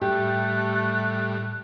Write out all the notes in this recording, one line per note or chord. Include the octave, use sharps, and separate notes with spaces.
A2 G3 A3 G4 F#6